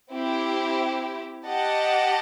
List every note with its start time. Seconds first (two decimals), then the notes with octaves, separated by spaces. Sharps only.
0.12 C4 E4 G4
1.46 G4 D#5 F#5 A5